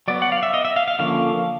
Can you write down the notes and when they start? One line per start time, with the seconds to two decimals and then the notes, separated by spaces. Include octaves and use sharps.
0.08 F#3 B3 D5
0.22 F#5
0.32 F5
0.43 E5
0.54 D#5
0.65 E5
0.76 F5
0.88 F5
0.99 D3 F3 A#3 C#4 F5